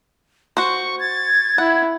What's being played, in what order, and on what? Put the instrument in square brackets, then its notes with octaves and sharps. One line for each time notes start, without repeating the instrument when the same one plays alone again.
[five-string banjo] F#4 C5 [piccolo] C#6
[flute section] G#6 [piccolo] A6
[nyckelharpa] E4 [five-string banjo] F#5